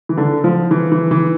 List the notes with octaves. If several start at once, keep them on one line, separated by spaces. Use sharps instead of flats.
E3
D3
F3
E3
E3
E3